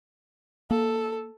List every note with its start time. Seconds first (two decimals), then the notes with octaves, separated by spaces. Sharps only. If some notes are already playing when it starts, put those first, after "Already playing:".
0.71 A#3 A4